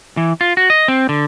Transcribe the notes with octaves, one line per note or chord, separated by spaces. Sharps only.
E3
F4
F#4
D#5
C4
D3